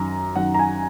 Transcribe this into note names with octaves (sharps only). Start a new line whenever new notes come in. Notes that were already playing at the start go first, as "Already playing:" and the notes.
Already playing: F#2 D#3 A#5
F#2 D#3 F#5
A#5
G#5